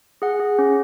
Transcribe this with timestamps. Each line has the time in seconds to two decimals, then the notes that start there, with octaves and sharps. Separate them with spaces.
0.22 G#4 F#5
0.40 G#4
0.59 C#4